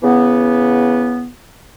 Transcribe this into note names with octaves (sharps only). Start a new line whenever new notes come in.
C#3 E3 B3